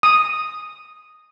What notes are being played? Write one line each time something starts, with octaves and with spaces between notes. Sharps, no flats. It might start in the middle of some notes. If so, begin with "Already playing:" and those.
D#6